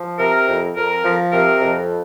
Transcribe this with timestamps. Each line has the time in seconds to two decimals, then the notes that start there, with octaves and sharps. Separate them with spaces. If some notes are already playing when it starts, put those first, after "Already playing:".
Already playing: F3
0.18 C3 A#4
0.46 F2
0.75 F2 A#4
1.04 F3
1.32 C3 A#4
1.61 F2